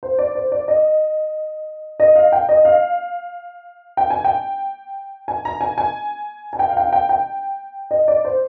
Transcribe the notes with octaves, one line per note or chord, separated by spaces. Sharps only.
C5
D5
C5
D5
D#5
D#5
F5
G5
D#5
F5
G5
G#5
G5
G#5
A#5
G#5
G#5
G#5
G5
F5
G5
F5
G5
G5
D#5
D5
C5